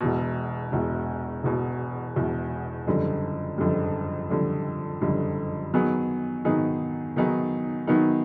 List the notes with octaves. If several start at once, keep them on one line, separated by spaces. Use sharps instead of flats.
E1 E2 B2
E1 E2 B2
E1 E2 B2
E1 E2 B2
F#1 F2 D3 G3
F#1 F2 D3 G3
F#1 F2 D3 G3
F#1 F2 D3 G3
D#3 F#3 B3 D#4 G#4
D#3 F#3 B3 D#4 G#4
D#3 F#3 B3 D#4 G#4
D#3 F#3 B3 D#4 G#4